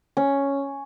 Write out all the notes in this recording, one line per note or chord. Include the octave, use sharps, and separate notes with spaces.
C#4